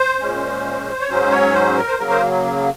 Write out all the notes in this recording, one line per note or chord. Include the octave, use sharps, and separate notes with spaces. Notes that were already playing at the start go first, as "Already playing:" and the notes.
Already playing: C5
A#2 G#3 C#4
C#5
G#2 F#3 C#4 C5
C#5
C5
A#4
C5
C#3 F#3 A#3 A#4
C5